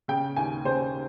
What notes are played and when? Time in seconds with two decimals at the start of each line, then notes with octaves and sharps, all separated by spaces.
0.08 C#3 G5
0.36 D#2 G#5
0.65 C#3 C5